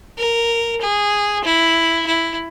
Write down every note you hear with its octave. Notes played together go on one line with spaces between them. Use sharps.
A#4
G#4
E4
E4